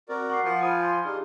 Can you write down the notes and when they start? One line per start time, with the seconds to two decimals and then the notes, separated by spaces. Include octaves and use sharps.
0.09 C4 F#4 A#4 D5
0.30 F#5 C#6 D6 C7
0.45 F3 C5
0.61 F4 G#5 B5 D#6
0.82 C6
1.05 D4 D#4 F4 G4 G#4